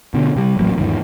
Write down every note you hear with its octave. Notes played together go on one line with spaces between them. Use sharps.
B2 D3
C3 G3
D#1 A1 F#3 A#3
E2 G#2 D#3